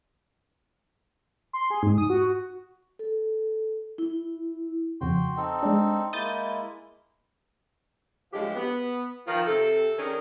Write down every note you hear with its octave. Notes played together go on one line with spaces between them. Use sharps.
C6
G#4
G#2
D#6
F#4
A4
E4
F2 C#3 F#4 G5 C6
C4 D#4 A4
G#3 D4
G#3 A#3 E4 D#6 G6 A6
A2 D3 F3 F#3 G#3 G4
B3
D#3 F3 F4
C3 A4
D#3 C#4 D4 G#4 A#4